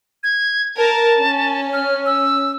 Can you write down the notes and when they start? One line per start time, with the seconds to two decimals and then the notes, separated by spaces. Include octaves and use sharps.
0.23 G#6
0.77 A#4 A5
1.19 C#4
1.73 F6
2.06 E6